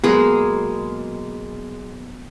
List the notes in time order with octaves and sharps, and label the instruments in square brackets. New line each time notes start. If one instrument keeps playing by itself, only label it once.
[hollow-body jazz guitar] B2 F#3 [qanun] G#3 A#3 G#4